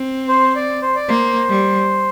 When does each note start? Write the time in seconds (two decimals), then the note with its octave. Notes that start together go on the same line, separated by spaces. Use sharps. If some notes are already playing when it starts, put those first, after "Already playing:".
Already playing: C4
0.29 C5
0.56 D5
0.82 C5
0.96 D5
1.08 A#3 C5
1.49 G3